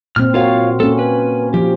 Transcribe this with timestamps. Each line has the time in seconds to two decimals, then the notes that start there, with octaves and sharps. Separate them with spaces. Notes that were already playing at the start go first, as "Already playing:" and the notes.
0.16 A#2 C4 F6
0.34 F4 F#4 A#4 C#5 F5
0.80 A#3 C#4 A4
0.99 B4
1.54 F3 G4